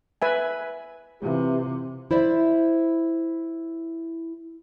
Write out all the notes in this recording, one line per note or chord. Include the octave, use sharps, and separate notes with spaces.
B4 E5 G#5
C3 E3 F4 G4
E4 C5 D5 E5